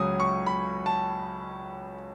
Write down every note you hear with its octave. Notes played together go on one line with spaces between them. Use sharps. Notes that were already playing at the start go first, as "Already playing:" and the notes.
Already playing: C#2 C#3 F#3 C#4 G#5 D#6
C#6
B5
A5